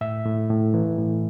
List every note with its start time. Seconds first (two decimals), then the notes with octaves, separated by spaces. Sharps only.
0.01 A2 E5
0.26 A2
0.50 A2
0.74 E3
0.98 A2